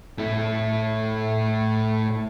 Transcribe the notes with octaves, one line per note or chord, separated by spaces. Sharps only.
A2 E4